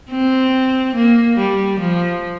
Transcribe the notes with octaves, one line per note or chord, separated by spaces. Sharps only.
C4
A#3
G3
F3